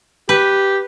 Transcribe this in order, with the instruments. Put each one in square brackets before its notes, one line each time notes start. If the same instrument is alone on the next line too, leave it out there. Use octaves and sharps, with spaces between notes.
[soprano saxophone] G4 [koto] B4